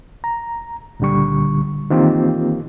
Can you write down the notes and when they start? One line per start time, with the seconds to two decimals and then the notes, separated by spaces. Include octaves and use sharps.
0.24 A#5
1.00 C#2 A#2 D3 G3 C#6
1.90 D#3 E3 A#3 C4 F4 G4